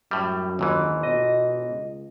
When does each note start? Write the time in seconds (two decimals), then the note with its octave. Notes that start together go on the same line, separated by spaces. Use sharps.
0.11 F#2 A2 G3
0.59 G1 D#2 G#2 E3
1.03 B2 D#5
1.70 C#2